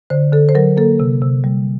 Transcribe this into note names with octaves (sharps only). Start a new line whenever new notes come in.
D3 C5
D3 A4
C5
F#3 A#4
A#3 A4
C3
C3
G3